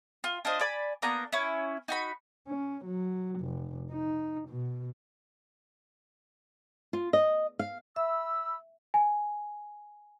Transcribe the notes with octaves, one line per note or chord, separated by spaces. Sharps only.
F4
D4 F4 C5 D#5
D5 G#5 B5
A#3 B3 D4 A#5
C#4 E4
D#4 F#4 B5
C#4
F#3
F1
D#4
B2
F4
D#5
F5
E5 B5 E6
G#5